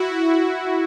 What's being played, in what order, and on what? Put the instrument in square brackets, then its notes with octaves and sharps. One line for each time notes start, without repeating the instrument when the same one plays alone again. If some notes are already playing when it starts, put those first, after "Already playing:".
Already playing: [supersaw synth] E4 F#4